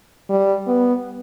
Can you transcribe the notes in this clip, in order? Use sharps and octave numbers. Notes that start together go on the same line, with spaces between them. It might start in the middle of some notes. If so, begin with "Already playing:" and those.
G3
B3